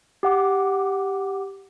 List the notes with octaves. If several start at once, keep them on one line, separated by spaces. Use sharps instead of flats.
G4 F#5 D6